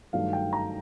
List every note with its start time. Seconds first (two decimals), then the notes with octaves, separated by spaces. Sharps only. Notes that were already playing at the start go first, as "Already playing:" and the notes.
0.13 G2 D#3 F#3 A3 F5
0.33 G5
0.53 A#5